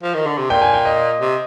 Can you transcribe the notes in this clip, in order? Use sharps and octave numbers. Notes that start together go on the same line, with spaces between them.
F3
D#3
D3
C3
A#2 G5
G#5
G5
D#5
C3